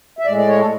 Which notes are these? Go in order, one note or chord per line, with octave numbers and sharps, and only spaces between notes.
E5
A2 G#3 D5
D5
C#5
A4